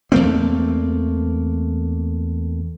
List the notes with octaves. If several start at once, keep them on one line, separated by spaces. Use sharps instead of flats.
E2 A3 A#3 C4